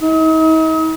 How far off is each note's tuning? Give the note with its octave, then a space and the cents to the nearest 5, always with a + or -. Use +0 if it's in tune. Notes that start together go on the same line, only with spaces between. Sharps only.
D#4 +40